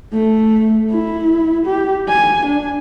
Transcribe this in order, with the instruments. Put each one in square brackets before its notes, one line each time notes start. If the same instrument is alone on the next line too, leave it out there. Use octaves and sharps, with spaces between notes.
[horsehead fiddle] A3
E4
G4
G#5
D4